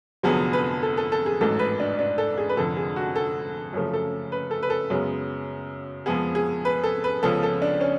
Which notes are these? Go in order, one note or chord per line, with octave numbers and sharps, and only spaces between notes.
F1 F2 D3 F#3 B3 G#4
B4
A4
A4
A4
G#4
A1 G#2 F#3 A3 A4
B4
D4
D4
A4
G#4
B4
F1 F2 D3 A4
G#4
F#4
A4
F#2 C#3 F3 A3
A4
B4
A4
B4
A4
F#2 C#3 G#3 B3
F2 F3 G#3 B3 G#4
G#4
B4
A4
B4
C#2 C#3 F3 B3 A4
A4
D4
C#4